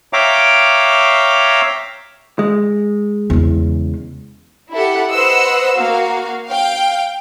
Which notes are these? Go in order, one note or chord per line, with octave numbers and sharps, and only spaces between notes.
C#5 E5 F5 G5 A#5 D6
G#3
E2 C#3
E4 G4 A4 F#5
B4 C5 D#5 F#5 C6 E6
A#3 F#4 F5
F5 G5